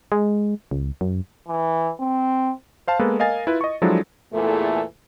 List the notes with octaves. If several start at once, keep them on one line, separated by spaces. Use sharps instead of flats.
G#3
C#2
F#2
E3
C4
C5 F5 A5
G#3 A#3 B3 A4 B4
A#4 D#5 F5 G#5 A6
E4 F4 B4
D#5 C#6
F3 F#3 G#3 D4 E4 A4
E2 A#2 E3 A3 G#4 A4